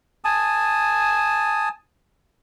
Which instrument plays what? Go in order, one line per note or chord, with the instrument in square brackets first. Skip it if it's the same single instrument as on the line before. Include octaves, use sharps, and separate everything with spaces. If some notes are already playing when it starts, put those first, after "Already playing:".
[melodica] G#5 A5 D#6